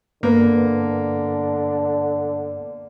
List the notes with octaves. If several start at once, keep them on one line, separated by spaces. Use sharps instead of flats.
G2 D3 A#3 B3 B4